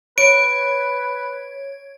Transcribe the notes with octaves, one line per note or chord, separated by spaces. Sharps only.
B4 C#5 D7